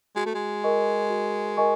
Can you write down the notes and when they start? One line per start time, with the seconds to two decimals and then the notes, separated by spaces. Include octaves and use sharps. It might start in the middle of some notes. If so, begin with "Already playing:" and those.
0.16 G#3 F#4
0.26 A3
0.35 G#3
0.64 A#4 D#5 G#5 C#6
1.10 F#4
1.57 A#4 D#5 G#5 C#6